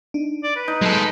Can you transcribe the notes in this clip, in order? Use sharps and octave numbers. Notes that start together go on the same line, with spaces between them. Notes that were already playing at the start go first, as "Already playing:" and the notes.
D4 D#4
D5
B4
D#4
F#3 G#3 A4